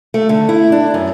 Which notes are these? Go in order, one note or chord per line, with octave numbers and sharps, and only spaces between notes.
A3
D3
E4
D4
F#2